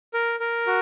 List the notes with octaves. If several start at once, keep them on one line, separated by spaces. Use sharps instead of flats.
A#4
A#4
F#4